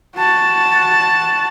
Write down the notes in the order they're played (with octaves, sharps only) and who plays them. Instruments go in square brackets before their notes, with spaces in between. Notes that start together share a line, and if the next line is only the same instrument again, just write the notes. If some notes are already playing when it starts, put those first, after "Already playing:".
[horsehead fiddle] F#4 A5